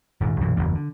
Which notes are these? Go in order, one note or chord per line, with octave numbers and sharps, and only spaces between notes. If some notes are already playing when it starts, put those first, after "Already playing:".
D#1 G#2
B1 F#2 A#2 E3
F#1 E2 G2
D3